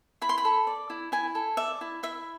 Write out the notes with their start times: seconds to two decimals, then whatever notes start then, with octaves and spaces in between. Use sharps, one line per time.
0.22 E4 B5
0.29 C6
0.38 B5
0.45 A4
0.67 D5
0.90 E4
1.12 E4 G#5
1.35 A4
1.57 D5 E5
1.81 E4
2.03 E4 E5